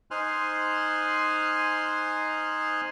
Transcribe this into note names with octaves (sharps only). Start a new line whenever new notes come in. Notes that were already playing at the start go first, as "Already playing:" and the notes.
D#4 C5 G#5 C6 F6 F#6